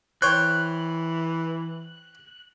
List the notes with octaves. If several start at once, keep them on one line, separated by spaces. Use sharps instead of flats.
E3 C5 C#5 G5 F#6